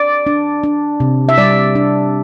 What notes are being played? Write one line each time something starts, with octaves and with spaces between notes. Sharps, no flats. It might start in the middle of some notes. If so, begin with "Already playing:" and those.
Already playing: D5
D4
D4
C3
E5
G3 D5
D4